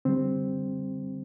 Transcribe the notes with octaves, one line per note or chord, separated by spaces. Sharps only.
D3 G3 C4